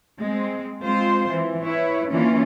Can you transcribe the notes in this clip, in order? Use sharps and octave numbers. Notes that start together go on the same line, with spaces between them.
G#3 C4
G#3 C4 F4 C5
E3
E4 B4 C#5
E3 A#3 C#4 D4 F4